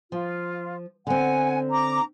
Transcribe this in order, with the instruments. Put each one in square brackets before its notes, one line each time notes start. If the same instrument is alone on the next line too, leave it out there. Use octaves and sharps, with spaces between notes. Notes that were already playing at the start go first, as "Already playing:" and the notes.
[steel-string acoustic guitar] F3 [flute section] F4
[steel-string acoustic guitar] D3 C4 [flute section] F#5 G#5
[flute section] A#5 D6